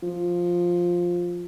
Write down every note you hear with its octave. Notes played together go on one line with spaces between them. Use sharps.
F3